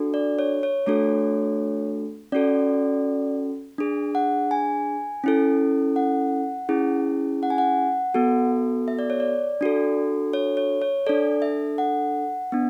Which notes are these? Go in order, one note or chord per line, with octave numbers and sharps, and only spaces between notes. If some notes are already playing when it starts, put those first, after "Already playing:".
Already playing: D4 F#4 A4
D5
C#5
C#5
A3 D4 F#4 A4 C#5
C#4 F#4 A4 D5
D4 G#4
F#5
G#5
C#4 E4 A4
F#5
C#4 E4 G#4
F#5
G#5
F#5
B3 F#4 A4
E5
D5
C#5
D5
D4 F#4 A4
C#5
C#5
C#5
D4 A4 D5
E5
F#5
B3 D4